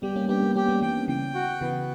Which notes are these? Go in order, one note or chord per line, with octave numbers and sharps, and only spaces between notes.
G3 B3 G4
A#3 C#4
B3 D4 G4
A#3 C#4
A#3 C#4 G4
G3 B3
E3 G3 G5
C#3 E3 G5
F#4
C#3 E3 B3